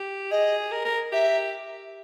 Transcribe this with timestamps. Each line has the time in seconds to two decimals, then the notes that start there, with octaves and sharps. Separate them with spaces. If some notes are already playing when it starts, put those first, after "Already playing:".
Already playing: G4
0.31 G#4 D#5
0.72 A#4
0.85 A#4
1.12 G4 E5